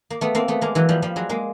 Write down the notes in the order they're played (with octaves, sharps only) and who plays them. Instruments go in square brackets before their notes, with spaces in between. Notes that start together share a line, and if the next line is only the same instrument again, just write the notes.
[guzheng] A#3
A3 B3
A#3 C4
A3 B3
G#3 A#3
E3 F#3
F3 G3
F3 G3
F#3 G#3
G#3 A#3